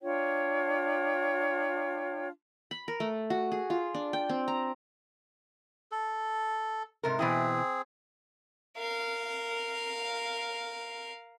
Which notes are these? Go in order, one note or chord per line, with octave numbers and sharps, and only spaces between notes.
D4 F4 C#5 G5
B5
A#4
A3
F#4
G#4
F4
D4
G5
C4
A#5
A4
G#2 C3 A#4
B2 E3 C4 E4 G#4
A#4 F5